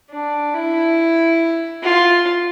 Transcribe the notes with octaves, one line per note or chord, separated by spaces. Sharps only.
D4
E4
F4